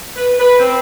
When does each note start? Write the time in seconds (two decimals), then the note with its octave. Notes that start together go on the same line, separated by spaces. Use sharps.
0.16 B4
0.40 B4
0.59 C4